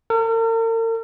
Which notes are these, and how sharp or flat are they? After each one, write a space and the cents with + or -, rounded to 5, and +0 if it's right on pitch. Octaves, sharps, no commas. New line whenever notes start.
A#4 -45